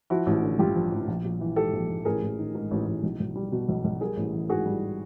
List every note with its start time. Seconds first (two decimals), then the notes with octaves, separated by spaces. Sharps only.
0.10 F3 E4 F#4
0.26 A1
0.43 D3
0.59 G2 F4 G4
0.76 F3
0.92 A1
1.08 A#1
1.25 A#1
1.41 E3
1.56 G#2 G4 A4
1.73 A#1
1.90 A#1
2.05 A1 G#4 A#4
2.22 A1
2.39 D#3
2.55 G#2
2.71 A1
2.87 A1
3.03 B1
3.20 B1
3.36 G3
3.52 B2
3.68 B1
3.84 B1
4.00 G3 G#4 A#4
4.17 A1
4.33 E3
4.49 G#2 F#4 G#4
4.66 G3